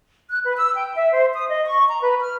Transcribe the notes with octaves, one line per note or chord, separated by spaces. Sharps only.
F#6
B4
E6
G5
E5
C5
D#6
D#5
C#6
A#5
B4
F6